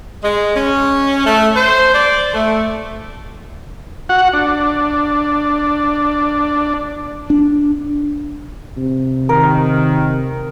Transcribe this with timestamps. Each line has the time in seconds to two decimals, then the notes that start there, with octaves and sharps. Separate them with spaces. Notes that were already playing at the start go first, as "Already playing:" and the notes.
0.23 G#3
0.55 C#4
1.25 A3
1.55 C5
1.94 D5
2.34 A3
4.09 F#4 F#5
4.33 D4
7.30 D4
8.77 C3
9.29 D#3 A#4